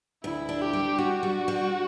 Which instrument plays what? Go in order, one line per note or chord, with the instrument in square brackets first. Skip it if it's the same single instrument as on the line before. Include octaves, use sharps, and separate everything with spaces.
[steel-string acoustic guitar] D2 [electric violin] E4
[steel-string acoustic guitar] D4
[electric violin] G4
[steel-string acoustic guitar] G3
[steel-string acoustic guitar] D4 [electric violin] F#4
[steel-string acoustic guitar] G3
G3